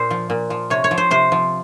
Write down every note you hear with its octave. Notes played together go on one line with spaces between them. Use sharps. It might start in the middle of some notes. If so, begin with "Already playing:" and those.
Already playing: A#2 C5
F3
A#2
F3
C3 C#5
C#5
F3
C5
C3 C5
F3